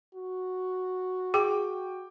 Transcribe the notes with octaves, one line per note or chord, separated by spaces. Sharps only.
F#4
G#4 G5 D6